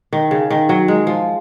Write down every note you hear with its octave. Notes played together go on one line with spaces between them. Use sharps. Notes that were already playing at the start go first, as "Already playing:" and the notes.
D#3
C#3
D#3
F#3
G#3
F3